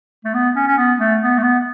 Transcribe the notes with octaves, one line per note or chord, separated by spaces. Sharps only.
A3
B3
C#4
C#4
B3
A3
B3
A3
B3